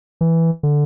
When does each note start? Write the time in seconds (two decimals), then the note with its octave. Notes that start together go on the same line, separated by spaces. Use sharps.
0.21 E3
0.63 D3